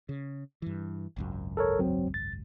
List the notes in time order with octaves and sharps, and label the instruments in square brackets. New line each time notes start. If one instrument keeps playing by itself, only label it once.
[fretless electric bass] C#3
G2 E3
G#1 C#2 F#2
[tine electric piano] A4 A#4 C#5
F#3 C4
A6